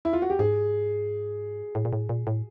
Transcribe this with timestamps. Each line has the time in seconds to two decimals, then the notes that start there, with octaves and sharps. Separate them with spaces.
0.05 E4
0.13 F4
0.22 F#4
0.30 G4
0.39 G#2 G#4
1.75 A2
1.85 A#2
1.93 A2
2.09 A#2
2.27 A2